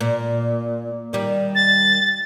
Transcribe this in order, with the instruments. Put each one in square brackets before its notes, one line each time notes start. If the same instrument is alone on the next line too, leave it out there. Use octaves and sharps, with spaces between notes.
[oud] A#2
D#3 G3
[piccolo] A6